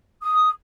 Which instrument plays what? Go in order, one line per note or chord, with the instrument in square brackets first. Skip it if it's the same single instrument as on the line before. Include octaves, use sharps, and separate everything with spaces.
[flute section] D#6